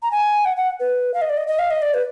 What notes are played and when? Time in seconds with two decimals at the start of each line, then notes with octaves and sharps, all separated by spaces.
0.03 A#5
0.11 G#5
0.45 F#5
0.57 F#5
0.80 B4
1.14 F5
1.22 D#5
1.29 D5
1.37 D#5
1.47 D#5
1.59 F5
1.71 D#5
1.82 D5
1.94 B4